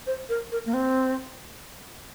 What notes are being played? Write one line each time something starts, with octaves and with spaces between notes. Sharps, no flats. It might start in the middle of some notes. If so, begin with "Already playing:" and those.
C5
A#4
A#4
A#3
C4